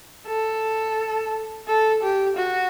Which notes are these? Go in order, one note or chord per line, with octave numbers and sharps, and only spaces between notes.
A4
A4
G4
F#4